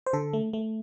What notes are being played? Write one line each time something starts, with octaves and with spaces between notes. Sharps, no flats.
C5
D3 A4
A3
A3